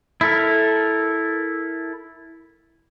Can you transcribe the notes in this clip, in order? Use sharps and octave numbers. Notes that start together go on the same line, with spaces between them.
E4 A4 A#4